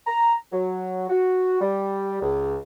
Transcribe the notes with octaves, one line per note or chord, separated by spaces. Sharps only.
A#5
F#3
F#4
G3
C#2